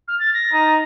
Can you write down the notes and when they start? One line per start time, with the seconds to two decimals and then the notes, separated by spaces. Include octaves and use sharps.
0.08 F6
0.20 A6
0.34 A#6
0.53 D#4